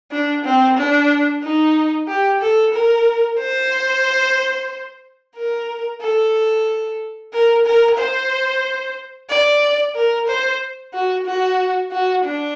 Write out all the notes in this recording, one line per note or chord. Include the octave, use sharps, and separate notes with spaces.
D4
C4
D4
D#4
G4
A4
A#4
C5
A#4
A4
A#4
A#4
C5
D5
A#4
C5
F#4
F#4
F#4
D4